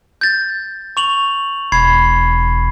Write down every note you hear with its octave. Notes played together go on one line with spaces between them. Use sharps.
G6 A6
C#6 F7 F#7
E1 B5 G#6 C7